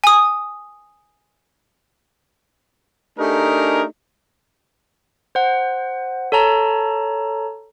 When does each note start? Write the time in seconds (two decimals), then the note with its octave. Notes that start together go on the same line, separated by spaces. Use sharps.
0.04 G#5 D#6
3.18 A3 D4 D#4 G4 G#4 A#4
5.35 C5 F#5
6.32 A4 C#5 A5 A#5